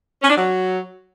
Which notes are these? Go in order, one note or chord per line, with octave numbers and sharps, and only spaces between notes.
C#4
D4
F#3